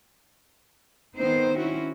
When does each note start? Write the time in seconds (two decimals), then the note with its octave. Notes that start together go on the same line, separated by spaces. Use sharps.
1.17 D#3 B3 C4 D#4 C5
1.57 C4 C#4 E4 F#4